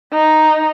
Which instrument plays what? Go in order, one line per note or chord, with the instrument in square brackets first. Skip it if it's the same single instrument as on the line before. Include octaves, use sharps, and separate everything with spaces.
[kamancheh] D#4